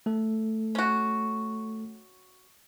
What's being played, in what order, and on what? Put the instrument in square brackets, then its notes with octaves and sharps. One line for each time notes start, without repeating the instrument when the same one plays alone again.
[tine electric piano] A3 A4
[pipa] C#4 F#4